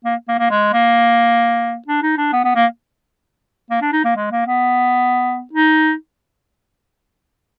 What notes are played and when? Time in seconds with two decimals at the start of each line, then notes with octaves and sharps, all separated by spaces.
0.05 A#3
0.28 A#3
0.39 A#3
0.50 G#3
0.73 A#3
1.87 D4
2.02 D#4
2.17 D4
2.33 B3
2.45 B3
2.55 A#3
3.70 A#3
3.81 D4
3.92 D#4
4.04 A#3
4.16 G#3
4.31 A#3
4.46 B3
5.53 D#4